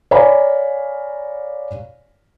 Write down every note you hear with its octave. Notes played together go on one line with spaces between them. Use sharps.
C#5 D5 F5 G#5 A#5 B5